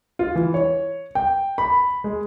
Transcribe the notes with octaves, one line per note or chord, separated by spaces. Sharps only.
F4
E3
C#5
G5
B5
G#3